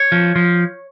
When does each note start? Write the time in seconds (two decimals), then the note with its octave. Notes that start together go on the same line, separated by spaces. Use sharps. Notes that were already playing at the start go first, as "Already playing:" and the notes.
Already playing: C#5
0.12 F3
0.36 F3